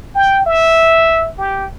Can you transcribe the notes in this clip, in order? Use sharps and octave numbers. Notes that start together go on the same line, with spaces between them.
G5
E5
G4